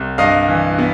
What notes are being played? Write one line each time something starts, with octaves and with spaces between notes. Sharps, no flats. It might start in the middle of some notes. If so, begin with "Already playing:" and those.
Already playing: C2
G2 D#5 F5
E3
B3